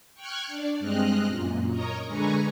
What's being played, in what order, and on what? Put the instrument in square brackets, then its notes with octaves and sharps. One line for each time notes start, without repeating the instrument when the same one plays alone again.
[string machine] G5 C#6 F6 F#6 G#6
D4 D5
G2 G#3 C4 D#5 F6 F#6
F#2 A#2
A#4 C#5 D#5 A#5
D3 G#3 B4 G#5 A#5 C#6